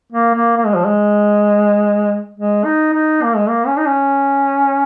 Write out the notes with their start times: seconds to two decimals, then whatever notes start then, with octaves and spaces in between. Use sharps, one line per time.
0.12 A#3
0.35 A#3
0.57 A#3
0.66 G#3
0.76 F3
0.86 G#3
2.34 G#3
2.64 D#4
2.93 D#4
3.23 A#3
3.36 G#3
3.48 A#3
3.67 C#4
3.77 D#4
3.86 C#4